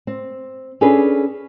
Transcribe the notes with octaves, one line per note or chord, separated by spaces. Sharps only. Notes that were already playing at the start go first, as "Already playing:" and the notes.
C4
C#4 D4 G#4 A4 B4